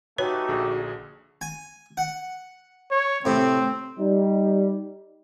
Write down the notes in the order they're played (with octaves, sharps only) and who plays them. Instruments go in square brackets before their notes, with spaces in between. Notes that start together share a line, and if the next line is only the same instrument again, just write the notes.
[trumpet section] A3 D#4 G4 [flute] F#4 [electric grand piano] B4 [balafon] C#5
[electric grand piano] A#1 D3 G#4
[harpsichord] G#5
F#5
[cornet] C#5
[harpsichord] A2 C3 [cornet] C4
[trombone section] G3 D#4